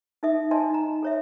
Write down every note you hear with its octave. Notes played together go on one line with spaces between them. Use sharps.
D#4 A4 E5 D#6
D5 D#5 G#5 A5 C6
D#4 A#5
A4 C#5 E5